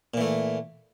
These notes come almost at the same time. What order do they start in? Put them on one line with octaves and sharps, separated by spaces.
A#2 E3 A3